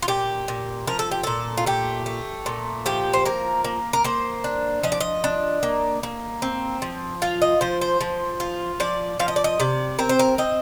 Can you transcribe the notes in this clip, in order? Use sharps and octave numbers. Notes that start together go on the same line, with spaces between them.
F4
A#2 G4
A#2
F3 A#4
A4
G4
A#2 A4
F4
A3 G4
A3
A#2
F3 G4
C5
A#3 A#4
A#3
A#4
A#3 C5
D4
F3 D#5
D5
D#5
D4
A#3
A#3
C4
F3
F4 F5
D#5
F3 C5
C5
F3
F4
F3 D5
F3 F5
D#5
D5
D#5
C3 D5
C4 A#4
C5
A#4
C4 D#5